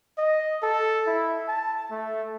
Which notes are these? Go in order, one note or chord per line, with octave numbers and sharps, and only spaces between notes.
D#5
A4
E4
A5
A3